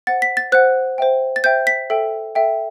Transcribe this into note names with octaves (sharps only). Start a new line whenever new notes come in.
C5 F#5 A6
B6
A6
C5 F#5 F#6
C5 E5 G5
A6
C5 E5 G5 G6
B6
A4 E5 G5
A4 E5 G5